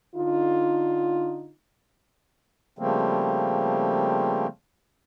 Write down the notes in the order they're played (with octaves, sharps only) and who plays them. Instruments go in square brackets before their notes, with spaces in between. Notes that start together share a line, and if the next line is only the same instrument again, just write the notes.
[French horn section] D3 D#4 F4
[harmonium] C#3 F3 G3 A3 A#3 C4